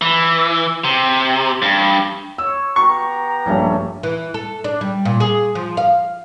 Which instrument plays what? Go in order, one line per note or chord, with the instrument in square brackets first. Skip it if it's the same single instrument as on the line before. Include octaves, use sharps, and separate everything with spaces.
[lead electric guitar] E3
C3
G2
[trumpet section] C#5 [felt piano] E6
[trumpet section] B3 G4 A#5 [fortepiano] C#6
[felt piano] A#1 G2 [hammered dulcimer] G3 A3 C#4
[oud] E3
A4
D4
G3
A#2
G#4
F3
F5